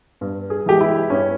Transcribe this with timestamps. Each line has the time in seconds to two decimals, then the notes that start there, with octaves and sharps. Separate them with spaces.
0.21 G2
0.50 G#4
0.66 E3 G#3 G4
0.81 E4
1.10 G2 C#4